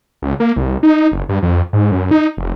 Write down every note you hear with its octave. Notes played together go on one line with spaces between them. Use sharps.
C#2
A#3
C2
D#4
F#1
G2
F2
G#2
F#2
D#4
F1